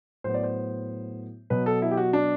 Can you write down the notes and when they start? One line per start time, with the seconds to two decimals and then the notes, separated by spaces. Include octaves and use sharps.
0.24 A2 F#3 B3 C5
0.34 D5
0.43 C5
1.50 B2 F#3 B3 B4
1.66 A4
1.82 E4
1.91 G4
1.97 F#4
2.13 D4